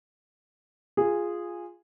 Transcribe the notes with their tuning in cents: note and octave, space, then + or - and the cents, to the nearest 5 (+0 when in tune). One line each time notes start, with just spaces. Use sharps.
F4 +0 G#4 -10